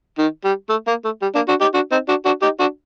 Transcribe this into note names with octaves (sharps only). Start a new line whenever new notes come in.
D#3
G3
A3
A#3
A3
G3
A#3 D4
D4 F#4
D#4 G4
D4 F#4
C4 D#4
D4 F#4
D4 F#4
D#4 G4
D4 F#4